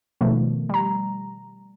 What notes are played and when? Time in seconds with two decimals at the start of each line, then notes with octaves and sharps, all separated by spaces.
0.21 B2 D#3 F3 A3
0.69 G3 A#5